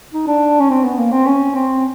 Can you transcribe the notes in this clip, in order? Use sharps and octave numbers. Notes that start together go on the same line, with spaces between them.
D#4
D4
C#4
C4
B3
A#3
C4
C#4
C4